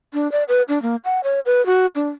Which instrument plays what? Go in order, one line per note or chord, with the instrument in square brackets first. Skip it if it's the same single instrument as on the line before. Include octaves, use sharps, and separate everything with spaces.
[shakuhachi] D4
D5
B4
D4
A#3
F#5
C#5
B4
F#4
D4